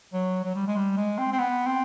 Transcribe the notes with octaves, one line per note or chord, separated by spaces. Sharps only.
F#3
F#3
G3
G#3
G3
G#3
C4
C4
B3
C4